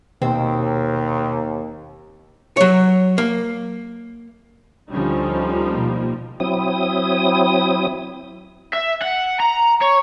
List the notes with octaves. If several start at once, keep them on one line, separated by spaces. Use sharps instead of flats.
D#2 B2 C4
F#3 C#5
A#3
D2 D3 F3 G3 C#4 D#4
B2 A#3
F#3 C4 E4 D#6
E5
F#5
A#5
C#5